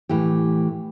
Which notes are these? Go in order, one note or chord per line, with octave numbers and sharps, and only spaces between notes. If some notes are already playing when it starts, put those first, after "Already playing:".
A2 E3 A3 G4